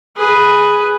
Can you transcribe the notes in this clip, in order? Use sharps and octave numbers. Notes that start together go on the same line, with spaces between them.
G#4 B4